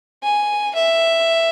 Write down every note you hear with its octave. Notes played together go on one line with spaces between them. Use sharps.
G#5
E5